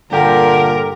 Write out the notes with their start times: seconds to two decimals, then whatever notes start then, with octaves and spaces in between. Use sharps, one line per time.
0.11 G2 A#2 D3 G4 A#4